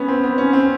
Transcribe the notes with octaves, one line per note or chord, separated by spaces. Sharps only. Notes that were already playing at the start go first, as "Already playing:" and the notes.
Already playing: B3 C#4
C4
B3
C#4
C4